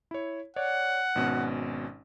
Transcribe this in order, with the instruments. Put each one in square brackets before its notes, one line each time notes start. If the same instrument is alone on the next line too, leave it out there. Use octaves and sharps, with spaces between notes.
[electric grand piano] E4 C#5
[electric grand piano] C#5 D5 [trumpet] F#5
[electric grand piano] G#1 B2 C#4